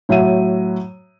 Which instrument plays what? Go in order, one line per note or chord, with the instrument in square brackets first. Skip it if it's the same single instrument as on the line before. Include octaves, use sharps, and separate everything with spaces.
[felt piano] A2 F#3 F#4 E5 D#7